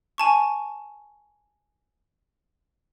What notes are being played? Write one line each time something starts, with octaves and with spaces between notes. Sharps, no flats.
G#5 A5 C#6